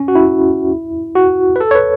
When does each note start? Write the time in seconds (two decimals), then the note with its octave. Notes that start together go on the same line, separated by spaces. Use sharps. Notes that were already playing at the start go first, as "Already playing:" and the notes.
Already playing: C#4
0.08 F#4
0.15 E4
1.15 F#4
1.56 B4
1.60 A4
1.71 C#5
1.75 B4